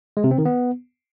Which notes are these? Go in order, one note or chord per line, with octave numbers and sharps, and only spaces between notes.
G#3
C3
C4
D#3
B3